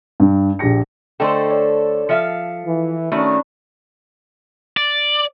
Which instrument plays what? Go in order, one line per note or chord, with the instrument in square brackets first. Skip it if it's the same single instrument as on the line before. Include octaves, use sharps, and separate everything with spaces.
[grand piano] G2
A#1 G4 G#4 A#6 C#7
[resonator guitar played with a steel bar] D3 A3 C5 [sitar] A4 [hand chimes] D5 D#5 G5
[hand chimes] C#5 D5
[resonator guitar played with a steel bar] F3 E5 F5 [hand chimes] C#7
[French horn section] E3
[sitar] D#3 [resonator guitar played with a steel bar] A3 F#4 [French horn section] C#4 D4 [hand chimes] B5
[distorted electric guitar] D5